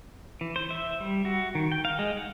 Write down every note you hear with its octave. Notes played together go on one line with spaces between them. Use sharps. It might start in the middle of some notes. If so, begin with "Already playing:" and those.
E3
C5
E5
G3
F#4
D#3
G5
F5
G#3
F#5